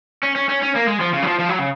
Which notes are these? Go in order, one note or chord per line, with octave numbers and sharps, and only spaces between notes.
C#4
C#4
C#4
C#4
A#3
G#3
F3
C#3
F#3
F3
F3
F#3
C#3